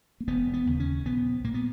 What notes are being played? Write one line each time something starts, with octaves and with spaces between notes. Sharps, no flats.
A#3
E1 B3
B3
D#2 C#3
C#4
A#1 B3
A#2 A#3
B3